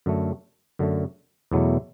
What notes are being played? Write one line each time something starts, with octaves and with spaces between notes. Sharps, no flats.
F#2 D3 A3
F#2 D3 A3
E2 B2 F#3 A3 E4